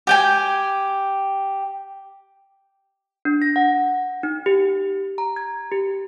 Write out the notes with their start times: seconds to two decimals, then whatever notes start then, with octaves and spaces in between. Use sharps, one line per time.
0.07 G4 G5 G#5
3.25 D4
3.42 A#6
3.56 F#5
4.23 D#4
4.46 G4
5.18 A#5
5.36 G#6
5.72 G4